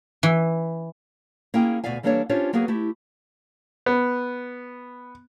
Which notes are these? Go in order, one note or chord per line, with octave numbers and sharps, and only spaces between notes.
E3
A#3 C#4 E4 G#4 F5 G5
D2 B2 D5 E5 F5 G#5
E3 G3 A#3 D4 A4 C#5
C#4 D4 F4 G4 C5 C#5
F#3 A#3 B3 F#4 G#4 B4
A3 E4 G4
B3